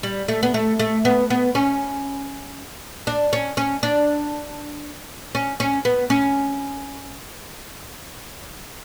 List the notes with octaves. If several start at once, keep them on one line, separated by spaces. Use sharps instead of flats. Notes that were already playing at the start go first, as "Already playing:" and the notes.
G3
A3
B3
A3
A3
B3
B3
C#4
D4
C#4
C#4
D4
C#4
C#4
B3
C#4